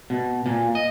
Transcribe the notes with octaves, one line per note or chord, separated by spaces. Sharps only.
B2
A#2
D#5